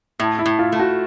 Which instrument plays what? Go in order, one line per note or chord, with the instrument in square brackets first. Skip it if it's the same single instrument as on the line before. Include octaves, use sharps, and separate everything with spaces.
[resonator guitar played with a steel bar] A2 [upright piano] E4
[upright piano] E4
[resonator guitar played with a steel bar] A2
[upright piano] F4
[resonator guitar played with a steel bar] A3
[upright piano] F#4